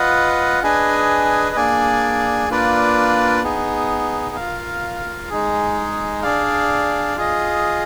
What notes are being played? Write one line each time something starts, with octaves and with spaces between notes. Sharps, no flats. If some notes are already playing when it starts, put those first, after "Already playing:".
Already playing: F4 B4 D#5 F#5
D4 G#4 B4 D#5 G#5
A#3 D4 G#4 D5 G#5
A#3 D4 F4 B4 D5
B3 D#4 G#4
F4 A#4 F5
G#3 D#4 G#4
D4 G#4 D5 F5
F4 G#4 D#5